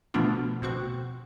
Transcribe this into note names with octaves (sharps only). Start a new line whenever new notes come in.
B2 F3 A3 B3 D4 F4
B2 C4 F#4 C#6